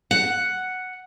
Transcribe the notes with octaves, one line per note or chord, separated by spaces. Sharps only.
F#5